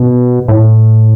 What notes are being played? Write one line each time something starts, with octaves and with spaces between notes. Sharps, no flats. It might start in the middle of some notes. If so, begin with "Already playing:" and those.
Already playing: B2
A2